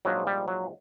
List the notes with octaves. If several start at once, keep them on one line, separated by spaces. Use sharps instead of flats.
A#1 G#2 F3 F#3
G3
F#3